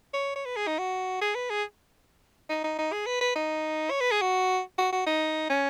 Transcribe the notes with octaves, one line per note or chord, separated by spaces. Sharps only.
C#5
C#5
B4
G#4
D#4
F#4
G#4
B4
G#4
D#4
D#4
D#4
G#4
B4
B4
D#4
C#5
B4
G#4
F#4
F#4
F#4
D#4
C#4